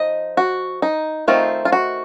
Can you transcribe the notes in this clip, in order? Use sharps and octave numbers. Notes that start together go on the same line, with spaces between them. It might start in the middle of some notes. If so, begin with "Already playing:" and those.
Already playing: F3 D#4 D#5
F#4
D#4
D#3 A3 C4 D#4 F4
F4
F#4